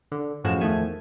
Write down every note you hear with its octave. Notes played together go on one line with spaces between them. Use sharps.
D3
F#2 A2 F3 G#3 F#4 E7
E2 D#3 F3 A3 G#5